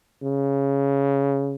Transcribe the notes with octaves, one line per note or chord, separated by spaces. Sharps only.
C#3